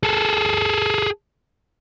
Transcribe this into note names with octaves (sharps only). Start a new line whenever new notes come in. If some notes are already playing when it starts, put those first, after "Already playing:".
G#4 A4